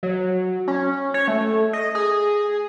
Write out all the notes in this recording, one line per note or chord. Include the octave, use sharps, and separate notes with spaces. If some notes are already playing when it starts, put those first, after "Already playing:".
F#3
C#4
C#5
A3
D#5
G#4